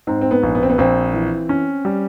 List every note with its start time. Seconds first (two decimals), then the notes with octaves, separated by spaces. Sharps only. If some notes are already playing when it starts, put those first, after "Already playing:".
0.07 G#2 C4
0.21 C4
0.31 B3
0.43 A#1
0.55 B3
0.63 C4
0.70 B3
0.78 A#1 C4
1.13 E3
1.49 C#4
1.85 G3